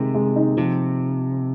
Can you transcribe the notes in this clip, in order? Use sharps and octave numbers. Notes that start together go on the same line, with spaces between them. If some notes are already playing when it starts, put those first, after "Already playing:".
Already playing: C3 D#3 G#3
G#3
D#4
C3 F3